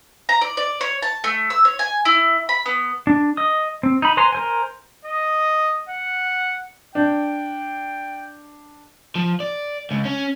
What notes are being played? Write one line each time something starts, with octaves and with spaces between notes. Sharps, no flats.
A#5
D5
D5
C#5
A5
A3
E6
C#5
G#5
E4
B5
B3
D4
D#5 D#6
C4
D#4 B5
B4 C5 G#5 A#5 C6
A#4 C5 G#5
D#5
F#5
D4 G5
F3
D5
C#2
C#4